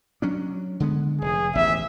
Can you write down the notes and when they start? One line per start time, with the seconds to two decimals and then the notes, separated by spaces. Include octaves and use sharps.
0.22 F#3 C#4 D4
0.80 D3 G#3 B3
1.22 F1 G#4
1.55 E1 A1 D#2 E5